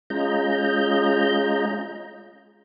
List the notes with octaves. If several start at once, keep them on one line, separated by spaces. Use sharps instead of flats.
G#3 C#4 F4 D#5 A#5 G6